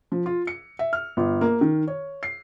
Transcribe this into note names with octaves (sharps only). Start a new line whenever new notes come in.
F3
F4
C#7
E5
F6
G1
A#3
D#3
C#5
C7